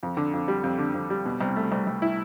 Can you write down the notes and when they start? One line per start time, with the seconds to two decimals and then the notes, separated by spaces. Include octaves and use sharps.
0.03 F2
0.17 D3
0.33 F2
0.48 G3
0.64 F2
0.79 D3
0.94 F2
1.10 G3
1.26 B2
1.41 C2
1.56 A3
1.72 C2
1.87 C2
2.02 E4